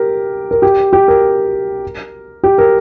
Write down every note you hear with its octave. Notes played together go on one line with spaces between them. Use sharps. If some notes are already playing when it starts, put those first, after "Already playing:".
Already playing: G4 A#4
A#4
G4
G4
A#4
G4
A#4